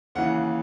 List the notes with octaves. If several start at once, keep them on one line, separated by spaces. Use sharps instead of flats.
D#2 C#3 E3 F#5